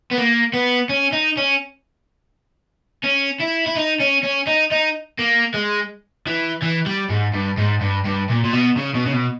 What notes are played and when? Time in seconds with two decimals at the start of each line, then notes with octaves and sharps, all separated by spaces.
0.11 B3
0.18 A#3
0.53 B3
0.89 C#4
1.13 D#4
1.37 C#4
3.04 C#4
3.40 E4
3.66 E4
3.75 D#4
4.00 C#4
4.23 C#4
4.47 D#4
4.71 D#4
5.19 A#3
5.54 G#3
6.27 E3
6.62 E3
6.86 G3
7.10 G#2
7.34 G2
7.58 G#2
7.81 G2
8.06 G2
8.30 A#2
8.44 A#2
8.53 B2
8.77 C#3
8.94 B2
9.06 C#3
9.13 B2